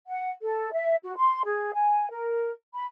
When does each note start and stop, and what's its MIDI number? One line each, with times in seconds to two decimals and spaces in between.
0.07 0.29 78
0.42 0.71 69
0.73 0.95 76
1.03 1.14 66
1.17 1.42 84
1.45 1.71 68
1.74 2.07 80
2.10 2.50 70
2.74 2.84 83